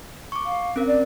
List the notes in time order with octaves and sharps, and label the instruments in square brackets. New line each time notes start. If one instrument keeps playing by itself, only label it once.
[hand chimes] C#6 D6
[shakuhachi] F5
[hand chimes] C4 C#4 A#4
[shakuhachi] D5